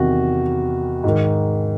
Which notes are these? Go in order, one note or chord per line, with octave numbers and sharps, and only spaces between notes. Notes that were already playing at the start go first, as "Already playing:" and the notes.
Already playing: E2 C3 D#3 F#4
G#2 D#3